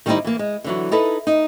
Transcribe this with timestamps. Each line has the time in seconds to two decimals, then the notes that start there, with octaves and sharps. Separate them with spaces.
0.06 D#3 G3 C4 C#4 D#4 E4
0.25 E3 A#3
0.39 G#3
0.64 D3 E3 F#3
0.92 D#4 E4 A4 B4
1.27 D#4